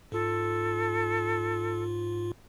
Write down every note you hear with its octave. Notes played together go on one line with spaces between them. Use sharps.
G#2 F4 A4